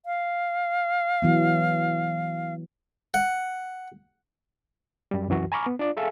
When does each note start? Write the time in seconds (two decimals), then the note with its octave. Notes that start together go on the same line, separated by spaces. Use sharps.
0.06 F5
1.22 E3 F#3 B3
3.14 F#5
5.11 F#2 G3
5.28 C2 F#2 E3 F#4
5.52 G#5 A#5 B5 C#6 D6 F6
5.66 B3
5.79 D4 F4 D5
5.97 G#4 A4 E5 F5 G#5